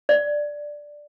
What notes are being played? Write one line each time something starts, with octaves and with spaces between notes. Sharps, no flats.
D5